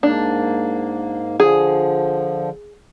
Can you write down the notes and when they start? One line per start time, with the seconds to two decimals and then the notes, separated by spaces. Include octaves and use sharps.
0.03 G#2 A#3 D4
1.40 D3 F3 G#4